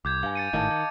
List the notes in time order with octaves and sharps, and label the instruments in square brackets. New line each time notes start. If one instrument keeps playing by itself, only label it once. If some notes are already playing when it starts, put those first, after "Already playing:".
[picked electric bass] C2 [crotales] D6 G6 G#6
[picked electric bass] G2 [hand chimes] F5 G#5
[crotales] A6 C#7 D#7
[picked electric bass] G#1 A2 D#3 [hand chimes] D#5 F5 A5
[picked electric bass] D#3